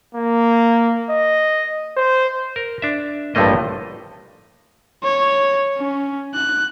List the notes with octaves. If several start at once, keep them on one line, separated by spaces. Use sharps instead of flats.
A#3
D#5
C5
A#4
D4 E5
A1 G2 F3 A3 A#3 D#5
C#5
C#4
F#6